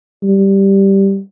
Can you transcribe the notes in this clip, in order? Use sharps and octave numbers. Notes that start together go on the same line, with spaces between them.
G3